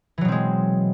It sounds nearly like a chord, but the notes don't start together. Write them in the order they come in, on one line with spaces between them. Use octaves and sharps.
E3 F#3 B2 C4 G#3